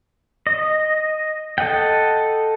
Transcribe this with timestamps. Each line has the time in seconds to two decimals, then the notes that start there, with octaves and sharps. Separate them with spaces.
0.47 D#5
1.58 A4 D#5 F#5 G5